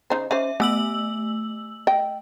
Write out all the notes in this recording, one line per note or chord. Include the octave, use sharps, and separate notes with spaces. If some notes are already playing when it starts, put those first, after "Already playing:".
C#3 D#4 C5
C#4 D#4 C5 E5
A3 B3 E6 F#7
D#5 G5